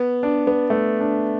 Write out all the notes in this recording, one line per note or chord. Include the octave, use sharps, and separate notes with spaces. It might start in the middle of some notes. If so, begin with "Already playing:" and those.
Already playing: B3
D4
B3
A3
D4